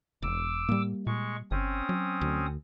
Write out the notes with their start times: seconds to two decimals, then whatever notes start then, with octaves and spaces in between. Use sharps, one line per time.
0.22 E1 D6 E6
0.69 A2 G3 A#3
1.07 A#2 G#3 C#6
1.51 G1 C4 C#4 D#6
1.89 F#3
2.21 D2